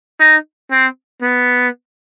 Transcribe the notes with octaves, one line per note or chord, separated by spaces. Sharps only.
D#4
C4
B3